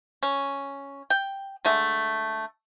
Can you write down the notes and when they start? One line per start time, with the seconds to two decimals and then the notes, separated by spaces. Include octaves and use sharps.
0.23 C#4
1.10 G5
1.65 D3 G#3 A3